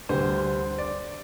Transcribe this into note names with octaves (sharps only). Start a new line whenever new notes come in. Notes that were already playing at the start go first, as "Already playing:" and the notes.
D2 D3 G3 C5
D5